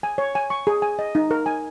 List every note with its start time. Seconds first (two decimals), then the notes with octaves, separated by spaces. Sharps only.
0.03 G#5
0.18 C#5
0.35 G#5
0.50 C#6
0.67 G#4
0.82 G#5
0.99 D#5
1.15 D#4
1.31 A#4
1.46 G#5